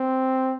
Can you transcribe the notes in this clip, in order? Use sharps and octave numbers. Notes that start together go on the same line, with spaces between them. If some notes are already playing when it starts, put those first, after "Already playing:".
Already playing: C4